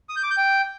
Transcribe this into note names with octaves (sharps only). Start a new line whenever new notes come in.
D#6
G6
D6
G6
G5